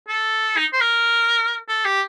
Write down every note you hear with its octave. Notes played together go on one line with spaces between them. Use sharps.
A4
D#4
C5
A#4
A4
G4